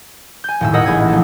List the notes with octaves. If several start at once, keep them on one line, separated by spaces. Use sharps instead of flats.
G#5 G6
D#1 A2 E6
G#4 A#4 D#5 F#5 E6
D#1 A1 E4 G#4 G#6
A#1 A4